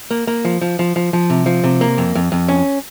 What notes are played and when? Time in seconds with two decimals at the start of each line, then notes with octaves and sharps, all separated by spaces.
0.11 A#3
0.27 A#3
0.45 F3
0.61 F3
0.79 F3
0.96 F3
1.13 F3
1.30 C3
1.46 F3
1.64 C3
1.81 A#3
1.98 F2
2.15 F2
2.32 F2
2.49 C#4